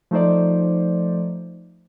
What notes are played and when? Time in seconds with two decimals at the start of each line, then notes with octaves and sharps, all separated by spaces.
0.11 F3 A3 D#4 C5 D5